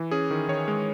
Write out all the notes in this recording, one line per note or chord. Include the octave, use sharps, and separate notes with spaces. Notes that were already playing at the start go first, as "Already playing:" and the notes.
Already playing: E3
C#4 G#4
D#3
D#3 C#5
G#3